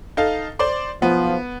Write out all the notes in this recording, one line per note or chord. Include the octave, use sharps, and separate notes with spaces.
D#4 A4 F5
C5 D5 C6
B1 F3 B3